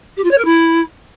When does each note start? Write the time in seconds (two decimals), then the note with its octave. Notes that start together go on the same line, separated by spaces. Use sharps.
0.16 G4
0.23 F4
0.30 C#5
0.37 A#4
0.44 E4